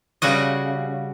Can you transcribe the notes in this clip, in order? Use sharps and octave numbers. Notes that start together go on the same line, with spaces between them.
C#3 G3 F#4 D#5